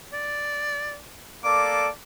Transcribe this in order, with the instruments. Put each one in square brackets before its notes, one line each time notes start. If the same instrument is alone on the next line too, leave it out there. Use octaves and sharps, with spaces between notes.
[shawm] D5
[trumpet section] A#3 A4 D5 [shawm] D6